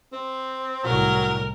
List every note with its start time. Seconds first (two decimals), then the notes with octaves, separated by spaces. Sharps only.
0.13 C4
0.84 C2 A2 F#3 A#4